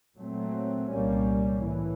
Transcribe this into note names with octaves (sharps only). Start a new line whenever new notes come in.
A#2 F#3 A3 C4
C2 A#2 G3 A#3 C#4
A2 E3